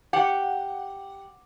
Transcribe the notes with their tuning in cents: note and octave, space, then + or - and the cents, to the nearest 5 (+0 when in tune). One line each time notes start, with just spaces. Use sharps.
G4 +0 F#5 +0